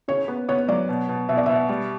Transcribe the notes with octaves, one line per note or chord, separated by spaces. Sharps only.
C#3 C#5
B3
B3 C#5
F#3 D5
B2
B2
B2 E5
D5
B2 E5
G3